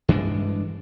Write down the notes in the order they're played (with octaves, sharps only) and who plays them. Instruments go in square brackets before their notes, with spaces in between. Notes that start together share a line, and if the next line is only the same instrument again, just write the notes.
[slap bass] G2 E3 G#3 D4